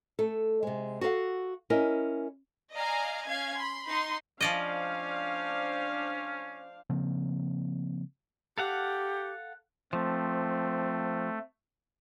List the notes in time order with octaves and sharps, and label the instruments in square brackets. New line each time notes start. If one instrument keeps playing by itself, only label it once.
[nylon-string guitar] A3 A4
C3 G#3
F#4 A4 A#4 F5 F#5
C#4 E4 A#4 D#5
[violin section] D5 D#5 F5 G#5 A#5
C#4 F5 G#6
B5 C6
D#4 C6
[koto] F3 D5 D#5 [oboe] C#4 [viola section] D4 C5 F5
[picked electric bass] C#3 F3 A#3 C4
[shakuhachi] G4 [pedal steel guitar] A4 F5 F#5
[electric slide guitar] F3 [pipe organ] A3 [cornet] C4